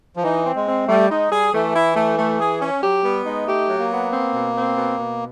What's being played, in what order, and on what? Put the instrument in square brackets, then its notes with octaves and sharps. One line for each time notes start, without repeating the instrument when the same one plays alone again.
[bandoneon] F3
[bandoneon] E3 [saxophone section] D#4
[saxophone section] C4
[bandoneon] G#3
[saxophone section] C4
[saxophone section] G3 [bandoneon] A3
[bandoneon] G#3 [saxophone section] D#4
[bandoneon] G3 [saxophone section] G#4
[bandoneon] E3 [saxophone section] A3
[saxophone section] E4
A3
A3
G#4
C#4
[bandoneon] F#3 [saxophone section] G4
[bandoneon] G3 [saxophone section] B3
[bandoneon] G#3 [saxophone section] D#4
[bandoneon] A3 [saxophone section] G4
[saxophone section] F#3
[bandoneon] A#3
[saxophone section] B3
C4
B2
C4
B2
B2